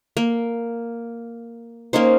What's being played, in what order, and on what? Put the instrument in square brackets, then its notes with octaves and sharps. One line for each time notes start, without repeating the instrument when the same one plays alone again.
[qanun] A#3
A#3 C#4 D#4 C5